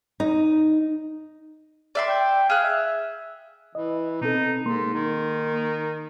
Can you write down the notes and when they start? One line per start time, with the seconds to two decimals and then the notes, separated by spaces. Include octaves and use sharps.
0.20 D#4
1.95 D5 E5 C6
2.08 G5
2.50 G#4 F5 F#6
2.64 E5
3.75 E3 D#5
4.21 B2 C4 D#4 A4
4.66 G#2 A#3 C6
4.94 D#3